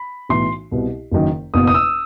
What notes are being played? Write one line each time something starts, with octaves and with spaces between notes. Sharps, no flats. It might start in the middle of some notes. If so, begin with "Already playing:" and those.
Already playing: B5
B1 A2 E3 C6
C2 B2
F#1 F#2 D#3
F#1 E2 B2 D#6
D#6
E6